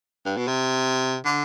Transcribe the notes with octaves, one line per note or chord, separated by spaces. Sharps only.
G2
B2
C3
D3